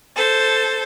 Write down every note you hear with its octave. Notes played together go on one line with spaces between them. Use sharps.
A4 C5